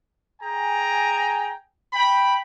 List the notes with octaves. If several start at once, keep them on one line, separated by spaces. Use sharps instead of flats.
G#4 G5 G#5 A#5
G5 B5